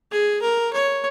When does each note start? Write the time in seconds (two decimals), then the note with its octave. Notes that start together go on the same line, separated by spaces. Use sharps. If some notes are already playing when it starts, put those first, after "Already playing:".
0.11 G#4
0.41 A#4
0.73 C#5